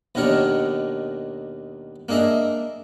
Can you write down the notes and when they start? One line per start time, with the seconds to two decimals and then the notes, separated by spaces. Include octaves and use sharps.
0.15 D#2 B2 D#3 D4 A#4 C#5
2.09 A#3 D4 G#4 D#5 E5